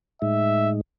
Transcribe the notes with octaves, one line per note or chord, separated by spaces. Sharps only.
A2 G#3 D#4 E5